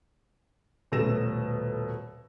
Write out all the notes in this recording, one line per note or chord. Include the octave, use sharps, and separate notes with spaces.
D#1 B2 A3 E6 A#6 E7